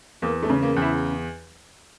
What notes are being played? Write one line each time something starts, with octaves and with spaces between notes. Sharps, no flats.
E2 A#3
A3
C#3
A#3
E2
E4